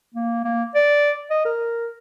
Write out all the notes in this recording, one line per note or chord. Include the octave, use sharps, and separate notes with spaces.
A#3
A#3
D5
D#5
A#4